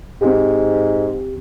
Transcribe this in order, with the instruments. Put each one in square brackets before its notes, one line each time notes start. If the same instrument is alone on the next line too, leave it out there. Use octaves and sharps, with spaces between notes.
[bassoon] G#2 [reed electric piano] C4 G4